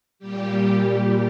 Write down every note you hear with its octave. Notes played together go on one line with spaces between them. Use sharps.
A#2 G3 G4